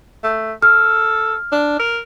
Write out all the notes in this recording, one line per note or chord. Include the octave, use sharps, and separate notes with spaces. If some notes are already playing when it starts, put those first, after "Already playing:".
A3
A4 F6
D4
A#4